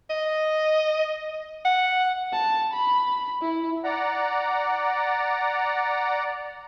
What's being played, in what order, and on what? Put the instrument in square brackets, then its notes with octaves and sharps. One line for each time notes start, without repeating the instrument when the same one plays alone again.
[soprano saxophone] D#5
F#5
[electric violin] A5
B5
E4
[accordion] D5 F#5 A#5